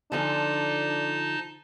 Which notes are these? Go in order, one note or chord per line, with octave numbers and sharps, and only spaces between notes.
D3 F3 D4 D#4 A4 A5